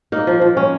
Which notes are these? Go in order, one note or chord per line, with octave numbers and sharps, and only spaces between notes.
A#3 D#4
F3
F3
C#4